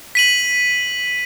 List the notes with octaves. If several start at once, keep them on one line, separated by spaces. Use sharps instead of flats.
B6 D#7 F#7